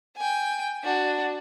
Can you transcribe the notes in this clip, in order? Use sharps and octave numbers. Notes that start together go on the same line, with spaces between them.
G5 G#5
D4 F#4